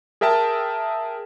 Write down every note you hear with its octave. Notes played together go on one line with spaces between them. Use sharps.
G#4 A#4 E5 G5 A5